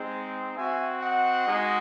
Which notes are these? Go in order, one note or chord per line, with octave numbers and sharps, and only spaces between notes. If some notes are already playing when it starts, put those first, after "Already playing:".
Already playing: G#3 C4 D#4
C4 F#4 E5 G#5
D#5 F#5
G#3 D#4 F#4